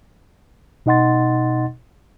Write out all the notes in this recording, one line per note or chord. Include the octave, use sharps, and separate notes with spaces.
B2 D#4 D#5 F#5 C6 A6